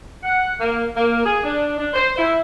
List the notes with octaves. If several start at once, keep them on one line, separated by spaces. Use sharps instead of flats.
F#5
A#3
A#3
G#4
D4
D4
C5
E4